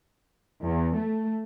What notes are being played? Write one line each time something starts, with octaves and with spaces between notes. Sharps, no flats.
E2
A3